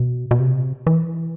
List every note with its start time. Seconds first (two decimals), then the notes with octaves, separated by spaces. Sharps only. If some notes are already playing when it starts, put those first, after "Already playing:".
Already playing: B2
0.31 B2
0.40 C3
0.87 E3